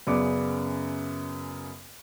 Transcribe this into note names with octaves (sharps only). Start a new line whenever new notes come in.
F#2 C#3 B3 D5 D6